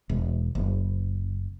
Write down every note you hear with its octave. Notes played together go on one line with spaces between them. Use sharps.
E1
F#1